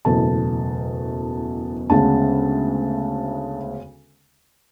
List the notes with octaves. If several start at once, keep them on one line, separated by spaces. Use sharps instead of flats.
F#1 E2 B2 A3 A5
D2 C#3 G#3 B3 A5